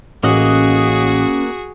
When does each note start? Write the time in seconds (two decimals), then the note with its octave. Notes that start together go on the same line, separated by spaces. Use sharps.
0.23 A1 A#3 C#4 F#4 G#4 D#5 F#5